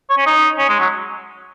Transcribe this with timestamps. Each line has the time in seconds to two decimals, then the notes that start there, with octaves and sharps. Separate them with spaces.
0.10 C#5
0.18 C#4
0.26 D#4
0.58 C#4
0.69 G#3
0.80 F#3